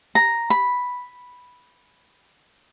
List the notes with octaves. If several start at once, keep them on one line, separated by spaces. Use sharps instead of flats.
A#5
B5